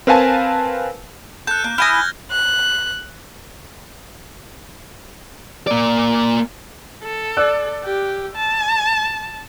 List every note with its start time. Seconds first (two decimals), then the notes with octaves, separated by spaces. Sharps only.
0.07 C4 A#4 B4 F5 G#5 A5
1.47 A4 F#6 G6
1.64 A#3
1.78 E4 G#5 D#6 F6 G#6 A#6
2.30 F#6
5.67 A#3 D5
7.03 A4
7.37 D5 E6 F#6
7.85 G4
8.36 A5